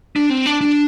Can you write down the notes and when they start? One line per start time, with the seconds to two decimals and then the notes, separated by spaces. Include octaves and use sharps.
0.16 D4
0.30 C4
0.46 D4
0.61 D4